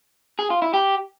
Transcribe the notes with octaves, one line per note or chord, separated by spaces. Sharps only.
G#4
F4
E4
G4